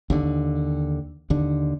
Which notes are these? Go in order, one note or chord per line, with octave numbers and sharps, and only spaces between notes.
D#2 D3
D#2 D3